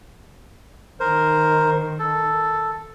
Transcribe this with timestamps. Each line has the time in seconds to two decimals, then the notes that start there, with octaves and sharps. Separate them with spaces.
1.00 D#3 A#4 C5
1.99 A4